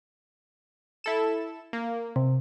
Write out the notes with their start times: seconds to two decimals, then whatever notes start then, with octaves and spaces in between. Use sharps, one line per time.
1.04 E4 A4 E7
1.73 A#3
2.16 C3